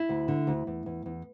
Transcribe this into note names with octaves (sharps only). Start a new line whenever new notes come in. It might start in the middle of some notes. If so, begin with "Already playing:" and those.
Already playing: E4
D2
D3
D2
E2
E2
E2